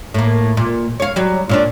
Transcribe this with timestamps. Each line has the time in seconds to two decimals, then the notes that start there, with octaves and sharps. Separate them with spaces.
0.14 A2 A#3
0.57 A#2
1.00 C#5 F5
1.16 F#3 G3
1.49 A#2 C#4 D4